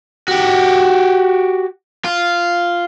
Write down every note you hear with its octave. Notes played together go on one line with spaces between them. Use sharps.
F#4 G4
F4